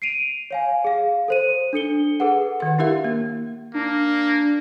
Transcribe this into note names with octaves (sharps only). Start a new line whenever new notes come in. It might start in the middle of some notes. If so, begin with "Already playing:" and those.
C7 D7 D#7 F7
C#5 F5 G#5
G#4 F5
A4 C5 D#7
D4 A4 C#7 G7
G#4 A4 B4 F#5
D#3 F#5
D4 E4 G4 A#4 E5 F5
A#3
A#3 D4